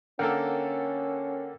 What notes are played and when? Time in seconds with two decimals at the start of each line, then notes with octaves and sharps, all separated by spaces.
0.19 D3 A#3 C#4 A4 A#4 F#5 G5